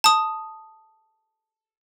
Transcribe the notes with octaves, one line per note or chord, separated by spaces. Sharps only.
A5 D#6